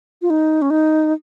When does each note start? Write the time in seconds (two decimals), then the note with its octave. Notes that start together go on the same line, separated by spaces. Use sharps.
0.22 F4
0.30 D#4
0.62 C#4
0.70 D#4